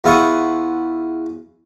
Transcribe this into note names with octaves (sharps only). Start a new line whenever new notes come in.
E2 E4 F4 F#5 C#6 D#6